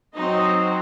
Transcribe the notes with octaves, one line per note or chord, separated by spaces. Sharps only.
F#3 C4 D#4 D#5